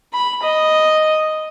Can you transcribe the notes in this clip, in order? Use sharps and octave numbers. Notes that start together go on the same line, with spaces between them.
B5
D#5